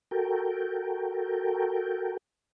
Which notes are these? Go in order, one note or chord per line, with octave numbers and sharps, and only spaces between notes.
F#4 A4 A#4 G5